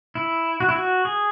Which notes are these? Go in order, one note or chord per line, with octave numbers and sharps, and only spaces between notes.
E4
F#4
E4
F#4
G#4